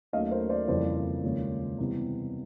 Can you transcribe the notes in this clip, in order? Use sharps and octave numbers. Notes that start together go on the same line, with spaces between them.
D#2 D#3 F#3 A3 C#4 D#5 F5
A#4 C5
C5 D5
F2 C#3 E3 G3 A#3 C5 D5
D#2 C#3 F3 G#3 C#4
C3 E3 G3 B3